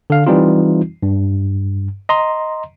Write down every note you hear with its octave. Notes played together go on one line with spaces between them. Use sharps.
D3 F5
E3 G3 C4 D#4 F4
G2
D#5 A#5 C6